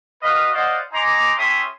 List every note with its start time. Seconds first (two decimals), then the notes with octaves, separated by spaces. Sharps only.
0.22 F#4 B4 D#5 F5
0.54 C5 D5 D#5 F5 F#5
0.93 D#4 G#5 A#5 C6 D6
1.37 C#4 G4 A4 E5 C6 D#6